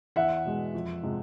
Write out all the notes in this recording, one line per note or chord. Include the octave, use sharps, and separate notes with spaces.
E2 E5 F#5
B2 G#3
F2
C3 F3 G#3